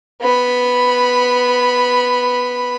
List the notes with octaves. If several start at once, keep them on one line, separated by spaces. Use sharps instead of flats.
B3 B5